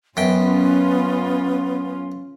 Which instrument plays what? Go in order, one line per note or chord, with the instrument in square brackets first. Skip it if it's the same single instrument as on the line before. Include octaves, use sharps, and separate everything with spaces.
[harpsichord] F#2 G5 [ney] B3 [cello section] C#4 F4